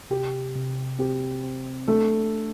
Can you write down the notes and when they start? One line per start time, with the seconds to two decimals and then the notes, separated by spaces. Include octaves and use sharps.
0.10 C3 G4
0.55 C3
0.99 C4 G4
1.43 C4
1.88 A3 D4 A4